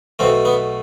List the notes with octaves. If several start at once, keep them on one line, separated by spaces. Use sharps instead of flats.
B1 B2 A3 C4
B3